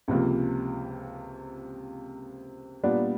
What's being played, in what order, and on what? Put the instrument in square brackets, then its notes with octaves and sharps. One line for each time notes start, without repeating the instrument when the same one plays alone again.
[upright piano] C#2 C3 F3 A#3
A#2 G3 B3 D4